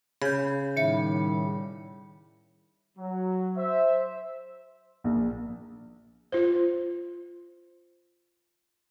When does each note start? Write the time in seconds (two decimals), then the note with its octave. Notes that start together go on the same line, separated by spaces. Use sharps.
0.22 C#3 B5 G6
0.77 A2 D#3 G3 E5 C#7
2.98 F#3
3.56 C5 E5
5.04 A#1
6.32 F4 C5